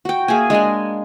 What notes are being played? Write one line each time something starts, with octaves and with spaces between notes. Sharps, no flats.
F#4 G5
A#3 G#4 E5 G#5
G#3 D4 D#5 G#5